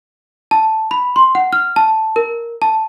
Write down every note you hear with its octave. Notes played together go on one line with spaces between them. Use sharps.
A5
B5
C6
F#5
F6
A5
A#4
A5